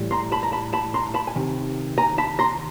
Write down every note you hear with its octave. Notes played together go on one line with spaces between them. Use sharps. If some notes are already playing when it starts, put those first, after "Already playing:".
Already playing: A2 E3 G3
A#5 C6
A5 B5
A#5
A5 B5
A5 B5
A#5 C6
A5 B5
G#5
C3 D#3
G#5 A#5
A5 B5
A#5 C6